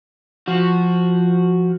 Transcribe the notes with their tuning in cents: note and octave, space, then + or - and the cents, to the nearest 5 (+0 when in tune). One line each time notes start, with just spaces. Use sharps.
F3 +0 F#4 -5